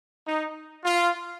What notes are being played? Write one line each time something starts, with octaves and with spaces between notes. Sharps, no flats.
D#4
F4